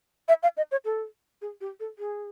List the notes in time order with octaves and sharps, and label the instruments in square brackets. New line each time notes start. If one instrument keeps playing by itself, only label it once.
[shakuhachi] E5
F5
D#5
C#5
A4
G#4
G4
A4
G#4